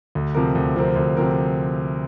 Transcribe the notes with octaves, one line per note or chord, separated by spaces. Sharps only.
D2
C3 F3 C4 A#4
D2
C3 F3 C4 A#4
D2
C3 F3 C4 A#4